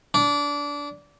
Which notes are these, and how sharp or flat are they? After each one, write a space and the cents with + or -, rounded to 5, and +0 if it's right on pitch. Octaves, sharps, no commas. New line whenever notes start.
D4 -20